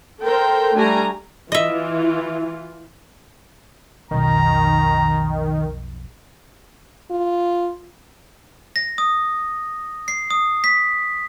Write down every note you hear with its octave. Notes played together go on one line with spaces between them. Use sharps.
A4 A#4 C5 G5
G3 A3 D4 G4 G#5 A#5
E3 F4 D#5 E5
B1 F2 D#3 A#5
F4
A#6
D#6
C7
D#6
B6